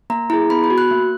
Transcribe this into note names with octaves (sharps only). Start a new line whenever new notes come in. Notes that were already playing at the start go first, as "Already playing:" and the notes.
A#3 A#5
E4 G#4 A#5
B3 B5
B5
F#4
F#6
A#3